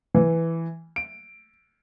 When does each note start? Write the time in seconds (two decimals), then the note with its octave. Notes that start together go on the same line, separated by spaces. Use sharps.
0.15 E3
0.96 D7